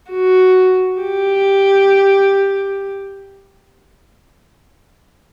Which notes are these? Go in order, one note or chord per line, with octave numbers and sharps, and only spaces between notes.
F#4
G4